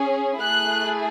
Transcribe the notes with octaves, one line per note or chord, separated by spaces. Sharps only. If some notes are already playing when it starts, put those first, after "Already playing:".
Already playing: C#4 G#4
A3 E4 G#4 F#6